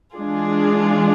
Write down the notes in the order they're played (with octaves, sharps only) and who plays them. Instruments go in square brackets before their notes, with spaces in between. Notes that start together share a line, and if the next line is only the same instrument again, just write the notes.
[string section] E3 G#3 D4 F4 G#4